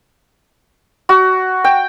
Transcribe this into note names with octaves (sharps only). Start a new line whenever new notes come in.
F#4
G5